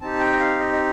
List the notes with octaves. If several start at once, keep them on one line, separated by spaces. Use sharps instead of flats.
C4 D#4 G4 A5
G5
D#5
F5
D#5
D#5